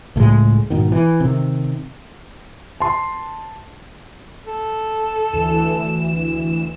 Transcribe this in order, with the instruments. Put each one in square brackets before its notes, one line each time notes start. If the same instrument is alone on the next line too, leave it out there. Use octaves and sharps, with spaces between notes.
[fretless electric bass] C#2 A2 F#3 G#3
G#2 B2 D#3
E3
C3 D#3
[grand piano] A5 C6
[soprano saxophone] A4
[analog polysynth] D2 E3 E7